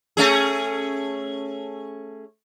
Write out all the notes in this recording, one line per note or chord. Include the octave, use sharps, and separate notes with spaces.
A3 C#4 G#4